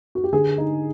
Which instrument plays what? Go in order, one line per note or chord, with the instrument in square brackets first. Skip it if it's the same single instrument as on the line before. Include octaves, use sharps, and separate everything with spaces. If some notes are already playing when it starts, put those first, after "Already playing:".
[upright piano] F#4
G4
D3 G#4
D#4